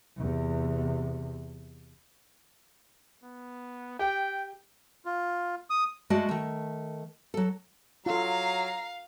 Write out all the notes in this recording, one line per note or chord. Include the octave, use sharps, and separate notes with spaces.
E2 C3
B3
G4 G5
F4
D#6
G#3 A3 F#4 D5 D#5 A5
D#3 A3
F#3 A4
F#3 F4 A4 F5 A#5